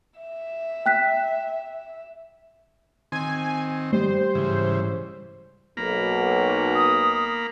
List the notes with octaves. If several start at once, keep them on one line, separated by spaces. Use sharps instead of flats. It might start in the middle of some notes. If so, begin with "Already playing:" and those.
E5
G5 F#6 B6
D#3 C4 G#5
G3 C5
G#2 C#3 E3
B1 A#3 A#5 B5
D#6